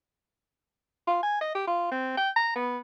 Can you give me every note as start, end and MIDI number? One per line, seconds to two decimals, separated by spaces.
1.07 1.23 65
1.23 1.39 80
1.41 1.54 75
1.55 1.67 67
1.67 1.91 65
1.91 2.14 60
2.17 2.30 79
2.36 2.51 82
2.56 2.78 59